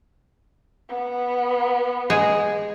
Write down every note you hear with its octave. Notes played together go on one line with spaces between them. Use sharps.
B3
G#3 G#4